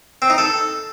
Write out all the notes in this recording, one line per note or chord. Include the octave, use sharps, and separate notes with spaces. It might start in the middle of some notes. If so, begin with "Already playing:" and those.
C4
D#4
A4